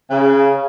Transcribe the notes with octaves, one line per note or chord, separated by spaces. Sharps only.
C#3